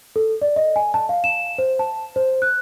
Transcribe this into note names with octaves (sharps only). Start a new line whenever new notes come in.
A4
D5
D#5
G#5
A5
F5
E7
C5
A5
C5
F#6